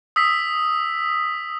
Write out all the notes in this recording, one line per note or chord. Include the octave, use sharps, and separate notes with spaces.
D#6 E6 B6